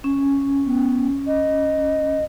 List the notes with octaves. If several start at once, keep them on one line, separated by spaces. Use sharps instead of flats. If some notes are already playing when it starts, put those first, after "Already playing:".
C#4
B3
D#5